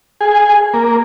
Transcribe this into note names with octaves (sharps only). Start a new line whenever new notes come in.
G#4
A#3